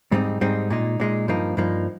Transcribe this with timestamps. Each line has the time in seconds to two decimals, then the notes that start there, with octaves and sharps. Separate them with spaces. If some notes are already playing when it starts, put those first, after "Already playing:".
0.12 G#2 G3 C4 D#4
0.41 G#2 G3 C4 D#4
0.70 A#2 G#3 D#4
1.00 A#2 G#3 D#4
1.28 G2 F3 A#3 D#4
1.57 G2 F3 A#3 D#4